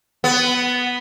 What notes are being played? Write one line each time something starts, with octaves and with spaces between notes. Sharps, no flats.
B3